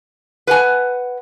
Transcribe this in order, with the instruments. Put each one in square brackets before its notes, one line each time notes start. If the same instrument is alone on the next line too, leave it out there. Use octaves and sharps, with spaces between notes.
[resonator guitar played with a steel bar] B4 F#5 G#5